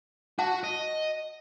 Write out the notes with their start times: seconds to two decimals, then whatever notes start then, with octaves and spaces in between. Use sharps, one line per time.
0.39 F#4 F#5 A5
0.64 D#5